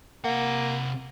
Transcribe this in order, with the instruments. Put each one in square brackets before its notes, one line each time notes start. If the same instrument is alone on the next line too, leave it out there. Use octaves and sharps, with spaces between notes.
[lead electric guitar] C3 F#5 [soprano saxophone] A#3